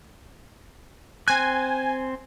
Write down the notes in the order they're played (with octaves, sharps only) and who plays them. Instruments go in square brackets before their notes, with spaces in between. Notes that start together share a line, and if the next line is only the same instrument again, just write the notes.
[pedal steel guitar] C4 F#6 [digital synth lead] G#5